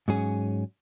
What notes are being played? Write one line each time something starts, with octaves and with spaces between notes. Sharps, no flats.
G#2 F#3 C#4 G#4